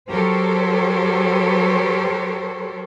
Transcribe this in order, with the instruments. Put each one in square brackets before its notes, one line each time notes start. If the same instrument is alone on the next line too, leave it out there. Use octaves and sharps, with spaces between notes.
[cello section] F#3 G4 A4 A#4 C5 C#5